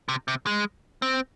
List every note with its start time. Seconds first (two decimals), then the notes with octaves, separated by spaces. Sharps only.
0.09 C3
0.28 C3
0.47 G#3
1.02 C4